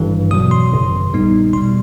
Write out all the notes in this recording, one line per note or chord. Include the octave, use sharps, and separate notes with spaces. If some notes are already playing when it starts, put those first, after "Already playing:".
Already playing: G#1 G2 E3
E2 B2 F#3 D#6
C6
G#1 F#2 C#3
A#1 A#2 G3 B3 D#4
E2 B2 G3 C6